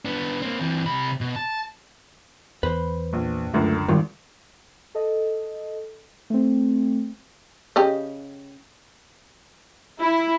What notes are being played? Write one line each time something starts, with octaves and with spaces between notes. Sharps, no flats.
B3 D4
A#3 C4
E3 C4
C3 B5
B2
A5
E2 B4 C5 B5
A#1
C#2 F#2 D3 A3
G#1 D#3 G3 F4
A4 D#5
A3 C4
C#3 G4 D#5
E4